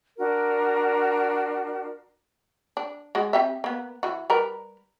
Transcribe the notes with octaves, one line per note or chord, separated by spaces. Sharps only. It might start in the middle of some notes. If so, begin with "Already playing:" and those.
D4 F#4 A#4
D4
G#3 F#4
C4 G4 E5
A#3 B3
E3 F#4
G3 A#4 B4